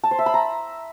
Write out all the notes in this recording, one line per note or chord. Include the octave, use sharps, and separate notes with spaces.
A5
C5
E5
B5
A#5